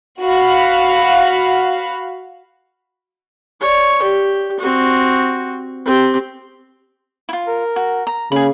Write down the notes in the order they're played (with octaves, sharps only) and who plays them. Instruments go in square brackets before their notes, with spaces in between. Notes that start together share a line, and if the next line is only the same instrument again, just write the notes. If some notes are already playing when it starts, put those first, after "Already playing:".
[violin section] F#4 F5 B5
[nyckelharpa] C#5 D5
G4
C4 F#4
C4 G4
[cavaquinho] E4 F4
[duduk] A#4
[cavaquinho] F#4
A#5
[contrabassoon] C#3 [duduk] A#3 [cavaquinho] G#4 B5